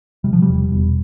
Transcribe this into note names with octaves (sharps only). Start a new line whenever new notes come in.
C3 G3
F3
G3
E1
E1